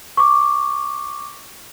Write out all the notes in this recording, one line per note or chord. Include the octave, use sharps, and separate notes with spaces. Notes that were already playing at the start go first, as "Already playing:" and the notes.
C#6 D6